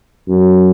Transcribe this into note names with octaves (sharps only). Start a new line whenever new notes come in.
F#2